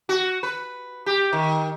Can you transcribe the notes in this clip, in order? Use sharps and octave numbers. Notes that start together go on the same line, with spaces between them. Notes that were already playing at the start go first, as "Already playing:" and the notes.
F#4
B4
G4
D#3